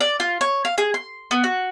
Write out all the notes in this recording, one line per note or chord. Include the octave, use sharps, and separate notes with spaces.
D5
F4
C#5
F5
G#4
C6
B3
F#4